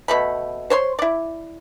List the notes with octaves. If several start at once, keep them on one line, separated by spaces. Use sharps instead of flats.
B2 A3 B5
C5 C#5 C6
E4 D5